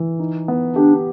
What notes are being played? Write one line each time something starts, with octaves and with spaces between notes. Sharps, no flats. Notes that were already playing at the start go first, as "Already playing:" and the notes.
Already playing: E3
D#4
B3
D4 G4